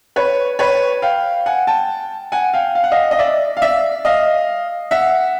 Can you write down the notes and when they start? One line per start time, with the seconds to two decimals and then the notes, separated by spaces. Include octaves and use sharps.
0.16 B4 C#5
0.59 B4 C#5
1.02 F5 G5
1.46 F#5 G#5
1.67 G5 A5
2.32 F#5 G#5
2.53 F5 G5
2.75 F5
2.84 F#5
2.91 D#5 F5
3.11 D#5
3.19 D5 E5
3.57 F5
3.62 D5 E5
4.05 D#5 F5
4.91 E5 F#5